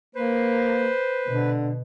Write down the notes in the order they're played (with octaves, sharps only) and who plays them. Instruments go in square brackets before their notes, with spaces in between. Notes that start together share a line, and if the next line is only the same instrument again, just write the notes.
[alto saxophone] A#3 [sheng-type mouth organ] B4 [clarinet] C5
[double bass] B2 [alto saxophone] D3